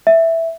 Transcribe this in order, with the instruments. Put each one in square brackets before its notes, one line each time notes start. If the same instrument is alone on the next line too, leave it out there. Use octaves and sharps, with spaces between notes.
[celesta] E5